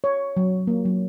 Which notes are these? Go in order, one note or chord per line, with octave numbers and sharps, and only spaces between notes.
C#5
F#3
A#3
F#3